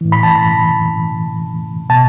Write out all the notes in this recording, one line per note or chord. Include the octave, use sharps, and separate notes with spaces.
A2 E3
B5
A5
B5
B2 A5